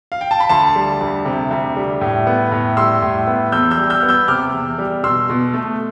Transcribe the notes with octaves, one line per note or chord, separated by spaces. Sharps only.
F5
G5
A5
B5
D2 A5 C6
G3
D2
C3
D2
G3
A2
B3
A2
G3 C6 E6
A2
B3
E2 E6 G6
E6 G6
G3
E6 G6
B3 F6
E6 G6
C3 D6 F6
E2
G3
B2 C6 E6
B2
A3